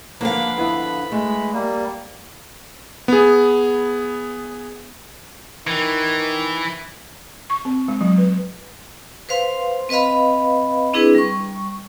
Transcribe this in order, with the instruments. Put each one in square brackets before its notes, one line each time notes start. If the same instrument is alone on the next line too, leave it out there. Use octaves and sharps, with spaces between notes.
[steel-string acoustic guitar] D3 F3 F5 [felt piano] A#3 [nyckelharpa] B4 B5
[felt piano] B3 E4
[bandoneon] G#3 [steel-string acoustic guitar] A3
[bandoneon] G3 A#3
[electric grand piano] B3 G#4
[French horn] D#3 [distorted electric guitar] E3
[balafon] C#6
C4
G#3
F#3
B4
[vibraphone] B4 C5 F5 C6
C4 B4 D#5 F5 B5
C4 D4 E4 G#4 B4
G3 C#6